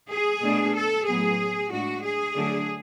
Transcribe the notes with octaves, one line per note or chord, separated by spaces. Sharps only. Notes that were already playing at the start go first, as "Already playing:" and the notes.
G#4
B2 A3 D4
A4
A2 F#3 B3 G#4
A2 G#3 D4 F#4
G#4
D3 F#3 A3 D4